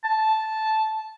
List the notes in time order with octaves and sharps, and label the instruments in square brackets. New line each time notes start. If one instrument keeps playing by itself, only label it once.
[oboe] A5